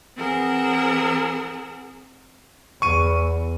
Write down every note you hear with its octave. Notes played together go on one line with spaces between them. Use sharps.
E3 C4 G#4 A#4 F#5 E6
E2 C#6 D#7